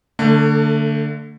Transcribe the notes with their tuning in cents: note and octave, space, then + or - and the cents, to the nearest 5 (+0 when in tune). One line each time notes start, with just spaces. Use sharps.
D3 +0 A3 +30